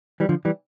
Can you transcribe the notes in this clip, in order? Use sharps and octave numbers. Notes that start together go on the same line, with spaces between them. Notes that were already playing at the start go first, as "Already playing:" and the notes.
E3 G3
D3 F3
E3 G3